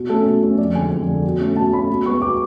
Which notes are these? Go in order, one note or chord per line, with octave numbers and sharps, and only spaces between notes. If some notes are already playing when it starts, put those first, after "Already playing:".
Already playing: B2
A3 C#4 A4
B2
A3 C#4
F2 D5
D3 G#3 G#5
F2
D3 G#3
B2
A3 C#4
B2 A5
A3 C#4 B5
B2
G#3 B3 C#6
B2 D6